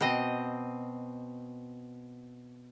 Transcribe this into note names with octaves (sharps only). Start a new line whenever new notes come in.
B2 C4 D#5